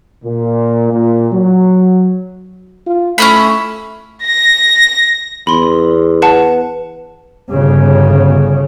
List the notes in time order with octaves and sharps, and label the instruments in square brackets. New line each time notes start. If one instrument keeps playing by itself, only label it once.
[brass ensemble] A#2
A#2
F#3
[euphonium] F4
[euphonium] A3 [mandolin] C#4 E4 B5
[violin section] A#6
[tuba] E2 [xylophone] B5 C6
[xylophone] B4 F#5 A5
[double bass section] G1 C#3